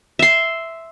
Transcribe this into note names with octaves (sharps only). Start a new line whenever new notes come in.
E5 C6